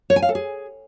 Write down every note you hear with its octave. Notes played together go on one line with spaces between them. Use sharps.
C#5
G#5
F5
A4
G#4